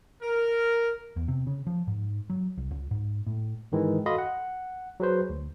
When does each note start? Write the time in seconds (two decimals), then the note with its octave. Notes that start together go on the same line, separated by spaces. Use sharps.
0.22 A#4
1.16 E2
1.28 C3
1.47 C#3
1.67 F3
1.87 G#2
2.30 F#3
2.57 C2
2.71 C#2
2.91 G#2
3.27 A2
3.72 G#2 D#3 E3 G#3
4.06 F#4 A4 D#5 F5 B5 C6
4.18 F#5
5.00 F#3 G#4 B4 C5
5.30 D2